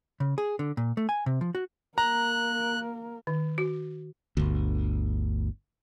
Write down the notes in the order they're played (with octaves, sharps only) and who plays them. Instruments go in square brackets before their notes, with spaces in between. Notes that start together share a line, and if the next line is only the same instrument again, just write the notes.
[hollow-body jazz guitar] C#3
G#4
D3
A#2
A3
G#5
C3
F3
F#4
[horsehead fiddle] A#3 A#4 [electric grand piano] A#5 [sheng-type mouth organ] F#6
[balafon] D#3
F#4
[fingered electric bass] G1 D2